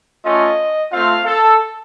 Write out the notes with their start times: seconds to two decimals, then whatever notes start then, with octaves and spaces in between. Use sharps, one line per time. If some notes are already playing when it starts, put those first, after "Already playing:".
0.24 A3 C#4 F4 D#5
0.91 A3 C4 F4 F5
1.25 A4